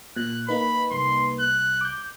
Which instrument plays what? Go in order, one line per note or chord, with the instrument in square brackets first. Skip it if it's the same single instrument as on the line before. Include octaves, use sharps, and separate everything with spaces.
[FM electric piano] A#2 [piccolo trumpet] F#6
[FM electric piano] A#3 D#4 B4 [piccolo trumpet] B5
[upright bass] C2 [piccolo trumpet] C6
[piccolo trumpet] F#6
[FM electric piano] D6 G6